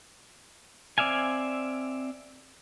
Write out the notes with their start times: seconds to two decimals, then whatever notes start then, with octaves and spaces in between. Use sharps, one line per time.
0.98 C4 D5 E5 F5 G#5